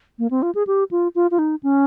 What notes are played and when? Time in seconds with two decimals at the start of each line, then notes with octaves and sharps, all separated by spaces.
0.19 A#3
0.31 C4
0.42 F4
0.55 G#4
0.67 G4
0.91 F4
1.15 F4
1.31 F4
1.39 D#4
1.63 C#4